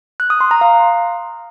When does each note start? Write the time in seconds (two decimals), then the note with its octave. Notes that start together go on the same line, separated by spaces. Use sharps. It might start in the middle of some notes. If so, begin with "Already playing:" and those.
0.20 F#6
0.30 D#6
0.41 C6
0.51 A#5
0.61 F5